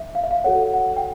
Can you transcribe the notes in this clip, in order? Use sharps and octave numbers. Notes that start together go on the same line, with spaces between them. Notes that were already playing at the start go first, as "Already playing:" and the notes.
Already playing: E5
F5
E5
F5
F#4 A4 C#5 F#5
F#5
G5